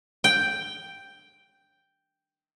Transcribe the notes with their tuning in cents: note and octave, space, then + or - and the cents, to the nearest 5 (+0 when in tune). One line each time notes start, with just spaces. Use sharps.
G5 +0